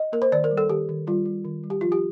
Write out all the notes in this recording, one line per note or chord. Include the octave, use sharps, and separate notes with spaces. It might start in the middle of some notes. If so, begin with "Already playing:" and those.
Already playing: D#5
A#3 A#4
C5
D#3 D5
A#4
G3
A4
D#3 G4
D#3
G3 F4
G3
D#3
G3
G4
F3 F4
G4